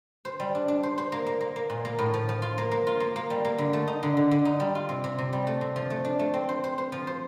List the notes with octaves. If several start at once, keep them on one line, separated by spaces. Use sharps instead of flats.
C5
G3
D4
D4
C5
C5
A#3
A#3
A#3
A#3
A#2
A#3
A2
F3
F3
F4
A#3
A#3
F4
A#3
A#3
G3
A#3
D3
A3
D#4
D3
D3
D3
D#4
G3
F4
C3
C3
C3
G3
A3
C3
F3
A3
D4
A3
C4
C5
C5
C5
F3
C5